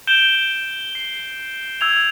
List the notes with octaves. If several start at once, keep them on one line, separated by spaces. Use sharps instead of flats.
G6 D7 E7 G7
G7
C7
E6 G#6 F7